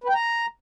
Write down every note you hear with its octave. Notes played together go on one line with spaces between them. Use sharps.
B4
G5
A#5